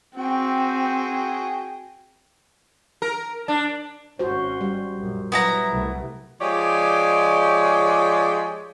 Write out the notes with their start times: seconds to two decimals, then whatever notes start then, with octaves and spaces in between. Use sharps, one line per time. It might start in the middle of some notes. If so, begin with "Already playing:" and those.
0.17 C4 F#4 G#4 G5
3.02 A#4
3.48 D4
4.19 G#1 C#4 F#4 C5
4.61 G3
4.96 A#1 F#2
5.32 F#3 B3 E4 A#5
5.71 C2 A3
6.40 F3 G#3 G4 C#5 D5